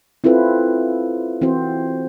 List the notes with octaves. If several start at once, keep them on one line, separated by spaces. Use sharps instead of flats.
C4 E4 F4 A4 B4
E3 C4 F#4 C5